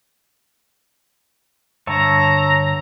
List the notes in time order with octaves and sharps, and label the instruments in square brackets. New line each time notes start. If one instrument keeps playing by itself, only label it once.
[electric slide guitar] G2 D3 [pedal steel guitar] C#5 E5 A5 [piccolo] A#5